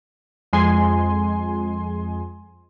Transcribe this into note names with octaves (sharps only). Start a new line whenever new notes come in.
F2 G#3 G#5 C6